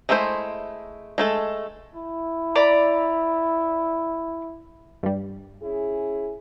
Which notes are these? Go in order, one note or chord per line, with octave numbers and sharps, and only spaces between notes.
G#3 A3 E4 G#4 C5
G#3 A3 A4
E4
D5 A#5 B5
G2 G3
C#4 E4 G#4